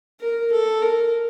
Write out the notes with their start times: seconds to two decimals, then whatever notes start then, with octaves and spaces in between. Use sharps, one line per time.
0.20 A#4
0.51 A4
0.82 A#4